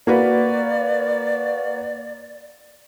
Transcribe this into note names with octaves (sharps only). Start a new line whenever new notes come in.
A#3 F#4 B4 D5